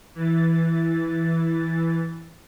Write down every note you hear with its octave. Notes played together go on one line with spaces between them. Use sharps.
E3 A6